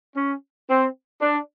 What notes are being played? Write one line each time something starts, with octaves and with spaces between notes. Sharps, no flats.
C#4
C4
D4